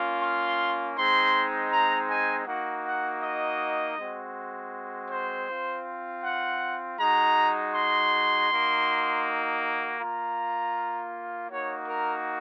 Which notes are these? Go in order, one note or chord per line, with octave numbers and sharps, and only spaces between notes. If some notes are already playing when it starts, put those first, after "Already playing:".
Already playing: A#3 C#4 F4
C6
G#3 C4 D#4 C6
A#5
G#5
A#3 D#4 F#4 F#5
F#5
D#5
G#3 C4 F#4
C5
C4 F4
F#5
G#3 D#4 F#4 A#5
C6
A#3 D#4 F#4
A#3 F4 A#5
A#3 D#4 F#4 C#5
A#4